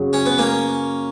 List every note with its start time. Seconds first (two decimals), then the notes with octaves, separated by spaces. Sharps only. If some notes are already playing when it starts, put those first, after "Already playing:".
Already playing: F#2 C#3 F#3
0.13 C#4
0.26 B3
0.38 A#3 C#4